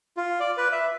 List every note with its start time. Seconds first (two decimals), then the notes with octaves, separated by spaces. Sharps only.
0.17 F4
0.40 D5
0.57 B4
0.72 E5